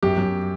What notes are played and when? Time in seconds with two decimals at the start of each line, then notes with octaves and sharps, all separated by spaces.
0.03 F#2 G4
0.18 F#2